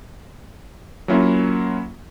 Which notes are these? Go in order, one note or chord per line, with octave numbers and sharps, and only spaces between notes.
F#3 A#3 C#4 E4 F4